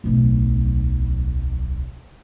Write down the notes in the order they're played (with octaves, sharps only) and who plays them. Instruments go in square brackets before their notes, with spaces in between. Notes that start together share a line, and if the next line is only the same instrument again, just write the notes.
[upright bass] D1 B1